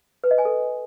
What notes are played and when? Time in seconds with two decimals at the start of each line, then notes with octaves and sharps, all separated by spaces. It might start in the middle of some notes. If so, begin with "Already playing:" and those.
0.24 B4
0.31 D#5
0.38 G#5
0.45 A4